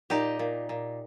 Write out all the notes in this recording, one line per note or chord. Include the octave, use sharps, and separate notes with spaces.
A#2 D#4 G4
A#2
A#2